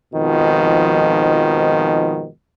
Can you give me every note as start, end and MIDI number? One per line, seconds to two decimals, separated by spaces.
0.14 2.29 41
0.14 2.29 44
0.14 2.29 47
0.14 2.29 51
0.14 2.29 53